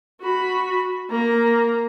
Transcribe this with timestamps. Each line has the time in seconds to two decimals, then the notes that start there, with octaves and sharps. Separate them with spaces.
0.21 F#4 B5
1.11 A#3 A#5